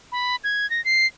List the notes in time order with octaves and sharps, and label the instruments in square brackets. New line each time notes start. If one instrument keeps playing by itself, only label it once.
[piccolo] B5
G#6
A#6
C7